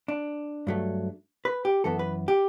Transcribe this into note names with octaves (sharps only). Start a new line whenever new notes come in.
D4
G2 F#3 A3
B4
G4
F#2 E3 B3 A4
B4
G4